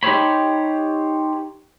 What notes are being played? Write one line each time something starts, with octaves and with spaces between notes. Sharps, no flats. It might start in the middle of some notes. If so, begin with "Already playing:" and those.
D#4 G4 G#4 C5 C#5 B5